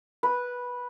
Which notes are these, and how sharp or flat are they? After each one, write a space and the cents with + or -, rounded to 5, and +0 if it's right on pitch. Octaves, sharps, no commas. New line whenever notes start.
B4 -10